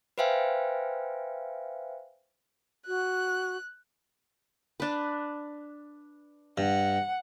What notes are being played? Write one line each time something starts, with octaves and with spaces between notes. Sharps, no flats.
B4 C5 E5 F5 G5 G#5
F#4 F#6
D4 B4
G2 F#5